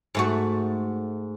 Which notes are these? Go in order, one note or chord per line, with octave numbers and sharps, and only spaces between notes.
G#2 A3 F#4